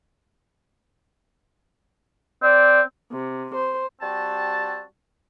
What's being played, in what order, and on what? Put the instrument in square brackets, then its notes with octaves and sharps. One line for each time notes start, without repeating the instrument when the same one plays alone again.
[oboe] C4 [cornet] D5
[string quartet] C3
C5
[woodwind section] G3 C4 F#4 A5